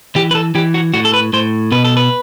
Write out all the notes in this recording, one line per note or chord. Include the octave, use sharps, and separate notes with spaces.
E3 G4
B4
A4
E3 G4
F#4
A2 F#4
A4
B4
A2 C5
B2 B4
A4
B4